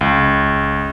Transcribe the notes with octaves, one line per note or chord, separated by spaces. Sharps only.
C#2